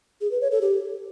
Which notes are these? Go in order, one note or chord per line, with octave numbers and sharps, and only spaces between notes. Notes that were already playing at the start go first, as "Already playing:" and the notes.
G#4
B4
C#5
A4
G4